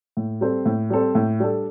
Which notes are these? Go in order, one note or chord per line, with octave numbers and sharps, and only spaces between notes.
A2
G3 C4 A4 C5
A2
G3 C4 A4 C5
A2
G3 D4 A4